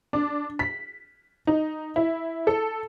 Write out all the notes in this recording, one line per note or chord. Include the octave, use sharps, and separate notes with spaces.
D4
B6
D#4
E4
A4